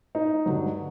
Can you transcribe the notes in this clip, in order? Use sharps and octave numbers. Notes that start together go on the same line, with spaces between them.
D#4
G2 D3 F#3